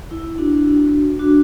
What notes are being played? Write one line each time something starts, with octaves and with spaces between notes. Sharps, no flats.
E4
D4 F#4
D4 F#4